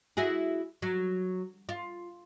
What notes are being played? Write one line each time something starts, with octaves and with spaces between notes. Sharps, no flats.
E4 F#4 G#4
F#3
F4